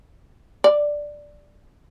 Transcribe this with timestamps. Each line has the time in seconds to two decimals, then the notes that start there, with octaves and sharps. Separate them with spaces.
0.64 D5